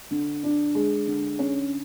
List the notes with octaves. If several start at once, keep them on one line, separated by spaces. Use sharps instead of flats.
D3
D4
G#3
D3
C#4